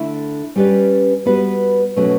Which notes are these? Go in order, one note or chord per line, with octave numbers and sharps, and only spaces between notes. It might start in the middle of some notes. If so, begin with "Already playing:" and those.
Already playing: D3 A3 E4
G3 C#4 G4 B4 D5
G3 B3 F#4 B4
B2 F#3 A3 C#4 F#4